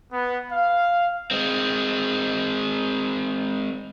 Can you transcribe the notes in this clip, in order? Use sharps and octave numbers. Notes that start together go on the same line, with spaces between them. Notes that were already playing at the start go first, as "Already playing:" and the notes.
B3
F5
G#3 C4